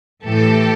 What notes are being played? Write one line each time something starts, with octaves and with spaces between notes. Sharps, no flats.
A2 E3 G4 A4